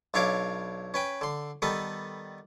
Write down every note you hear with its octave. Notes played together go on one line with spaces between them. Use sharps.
B1 D4 E4 C#5 F5 D6
C#4 B4 G5
D3 C6
D#3 G3 B3 A4 B4